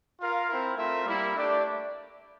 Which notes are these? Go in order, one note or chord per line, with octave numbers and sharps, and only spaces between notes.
F4 A#4 F5
C4 E4 A#4
A3 C4 F4 A#4 E5
G3 A#3 E4
A3 D4 G4 D5